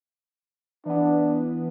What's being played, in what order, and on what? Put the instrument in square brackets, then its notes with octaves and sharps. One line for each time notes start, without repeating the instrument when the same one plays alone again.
[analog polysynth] E3 B3 [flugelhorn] D4